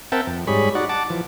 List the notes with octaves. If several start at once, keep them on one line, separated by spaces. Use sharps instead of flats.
C4 A#4 E5 F#5 G5 A5
F2
G#2 G3 G#4 C#5 B5
D#4 F#4 D5 F#5
F#5 A5 D6
E3 F3